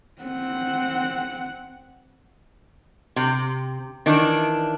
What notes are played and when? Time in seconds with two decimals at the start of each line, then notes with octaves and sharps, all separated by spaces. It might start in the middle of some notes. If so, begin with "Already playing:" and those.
0.22 C4 F#5
3.16 C3
4.06 D#3 E3 D4